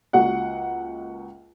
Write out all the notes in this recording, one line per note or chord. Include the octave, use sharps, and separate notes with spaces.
C#2 A#3 F#4 F#5